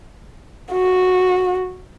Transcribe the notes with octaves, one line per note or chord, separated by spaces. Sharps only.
F#4